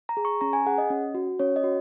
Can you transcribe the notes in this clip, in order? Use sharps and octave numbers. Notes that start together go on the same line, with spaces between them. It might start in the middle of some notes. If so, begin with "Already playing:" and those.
A#5
G#4
C#6
C#4 A#5
G#5
G#4 F#5
D#5
C#4
F#4
C#4 C#5
D#5
F#4